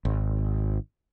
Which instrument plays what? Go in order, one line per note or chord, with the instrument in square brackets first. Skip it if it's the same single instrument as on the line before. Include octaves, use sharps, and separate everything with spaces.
[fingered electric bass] G#1